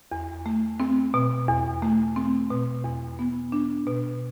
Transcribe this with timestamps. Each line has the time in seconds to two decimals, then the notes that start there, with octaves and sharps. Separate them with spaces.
0.12 E2
0.46 A3
0.80 C4
1.14 B2
1.48 E2
1.82 A3
2.16 C4
2.50 B2
2.84 E2
3.19 B3
3.52 D4
3.87 B2